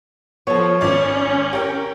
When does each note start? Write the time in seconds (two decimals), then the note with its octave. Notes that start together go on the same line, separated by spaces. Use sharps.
0.47 F3 B3 A4 C#5
0.81 G#1 C#4 D5 D6
1.53 G4 A#4